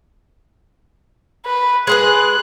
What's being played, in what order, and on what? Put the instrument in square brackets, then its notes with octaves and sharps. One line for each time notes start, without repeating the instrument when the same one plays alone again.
[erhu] B4
[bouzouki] G#3 G#4 B4 [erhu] F#6